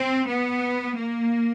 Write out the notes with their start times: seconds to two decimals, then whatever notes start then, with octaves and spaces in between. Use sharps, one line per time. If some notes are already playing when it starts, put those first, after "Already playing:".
Already playing: C4
0.27 B3
0.97 A#3